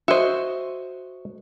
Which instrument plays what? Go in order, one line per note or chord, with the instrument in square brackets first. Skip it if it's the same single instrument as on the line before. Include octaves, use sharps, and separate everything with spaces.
[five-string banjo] F#4 C5 [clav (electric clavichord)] D#5 E5